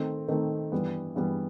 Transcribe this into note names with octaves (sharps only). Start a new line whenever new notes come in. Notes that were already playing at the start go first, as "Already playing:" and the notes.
Already playing: D#3 A3 C4 D#4
D#3 A3 C4 D#4
G2 E3 G3 B3
G2 E3 G3 B3